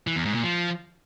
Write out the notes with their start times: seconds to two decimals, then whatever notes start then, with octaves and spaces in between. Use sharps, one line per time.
0.07 E3
0.16 E2
0.25 G#2
0.35 A#2
0.44 F3